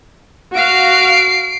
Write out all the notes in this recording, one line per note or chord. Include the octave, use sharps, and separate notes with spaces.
F#4 F5 C7 D7